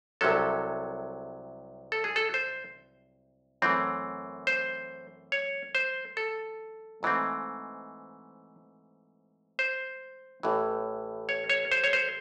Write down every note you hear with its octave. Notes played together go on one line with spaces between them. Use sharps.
C2 C3 F#3 C#4 A4
A4
G#4
A4
C5
F#2 E3 A3 C4
C5
C#5
C5
A4
G#2 E3 A3 C4
C5
A1 A2 E3
C#5
C#5
C5
C#5
C5